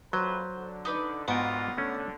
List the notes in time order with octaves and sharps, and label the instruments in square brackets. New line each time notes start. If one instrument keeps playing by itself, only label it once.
[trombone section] F2 A#2 B4 [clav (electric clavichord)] F#3 [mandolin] C5
[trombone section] D3
[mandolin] D#4 B4 D5
[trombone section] D#2 D3 F4 [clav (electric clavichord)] G#2 G5 [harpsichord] B3 [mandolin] F#4
[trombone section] D3 [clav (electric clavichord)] A3 C#4